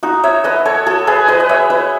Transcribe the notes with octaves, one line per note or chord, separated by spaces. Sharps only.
D#4 F#4
C#5 E5
B4 D#5
A4 C#5
F#4 A4
G#4 B4
B4 D#5
D#5
C#5 E5
B4 D#5